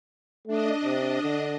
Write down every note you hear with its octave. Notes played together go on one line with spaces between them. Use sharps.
A3 D4 D#5
C3
D3